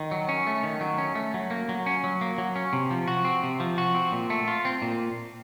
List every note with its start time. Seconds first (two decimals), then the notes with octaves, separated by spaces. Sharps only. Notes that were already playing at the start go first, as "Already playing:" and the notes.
Already playing: D#3
0.11 F#3
0.29 C#4
0.47 A3
0.63 D#3
0.81 F#3
0.98 C#4
1.15 A3
1.34 F#3
1.51 A#3
1.69 F#3
1.86 C#4
2.04 F#3
2.21 A#3
2.38 F#3
2.56 C#4
2.73 C3
2.90 F3
3.08 F#4
3.25 C4
3.43 C3
3.60 F3
3.78 F#4
3.95 C4
4.12 A#2
4.30 A3
4.48 F4
4.65 C4
4.82 A#2